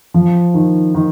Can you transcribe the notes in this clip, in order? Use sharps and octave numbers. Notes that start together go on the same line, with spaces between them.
F3
D#3
D#3